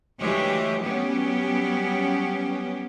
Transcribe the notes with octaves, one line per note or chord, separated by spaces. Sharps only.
D2 E3 G3 G#3 G4 C#5
F#3 G3 B3 C#4 G4